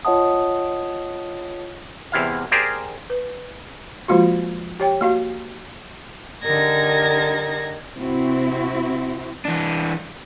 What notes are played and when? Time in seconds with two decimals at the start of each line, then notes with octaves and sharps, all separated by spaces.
0.05 F4 C#5 D#5 F#5 A5 D#6
2.12 E2 C3 E4 F5
2.51 G4 G#4 A#4 C5 D5 F5
3.10 B4
4.08 F3 G#3 A#3 F4 F#4
4.80 G4 C#5 G5
5.01 A#3 F#4 F5
6.43 D3 D#4 G4 A#4 G#6 A#6
7.97 C3 C4 E4 F#4
9.45 E3 D4